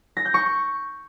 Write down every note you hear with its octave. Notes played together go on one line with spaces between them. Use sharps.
A#6
G6
C#6